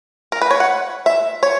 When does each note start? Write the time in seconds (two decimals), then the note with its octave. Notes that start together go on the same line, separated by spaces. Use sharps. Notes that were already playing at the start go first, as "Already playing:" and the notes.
0.32 A#4
0.42 B4
0.51 C#5
0.60 F#5
1.06 E5
1.43 C#5